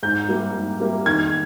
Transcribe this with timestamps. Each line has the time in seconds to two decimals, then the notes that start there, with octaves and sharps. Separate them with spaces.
0.03 G#2 G6
0.28 G3 A#3 E4 G4
0.54 G#2
0.80 G3 A#3 E4 G4
1.06 D#3 G#6